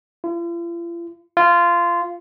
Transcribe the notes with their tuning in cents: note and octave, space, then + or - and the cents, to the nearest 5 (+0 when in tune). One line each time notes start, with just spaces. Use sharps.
F4 -45
F4 -15